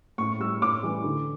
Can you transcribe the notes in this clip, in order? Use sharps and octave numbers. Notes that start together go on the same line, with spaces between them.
A2 C#6
G3 E6
A2 D6
E3 G3
D3